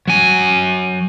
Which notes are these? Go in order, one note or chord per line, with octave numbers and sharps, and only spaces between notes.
F#3 G#5